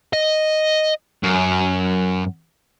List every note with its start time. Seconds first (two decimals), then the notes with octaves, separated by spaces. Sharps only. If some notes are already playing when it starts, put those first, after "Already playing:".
0.13 D#5
1.23 F#2